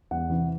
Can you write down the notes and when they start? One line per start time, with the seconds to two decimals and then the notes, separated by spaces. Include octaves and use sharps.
0.11 E2 F#5
0.30 C3 E3